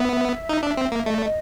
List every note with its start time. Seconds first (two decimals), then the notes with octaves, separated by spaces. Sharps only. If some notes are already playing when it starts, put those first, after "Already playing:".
Already playing: B3 E5
0.49 D#4
0.63 D4
0.77 C4
0.92 A#3
1.06 A3 D#5
1.18 D5
1.24 D#5